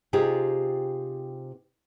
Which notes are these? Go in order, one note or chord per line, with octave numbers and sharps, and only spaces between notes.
C3 D#4 F4 G4 G#4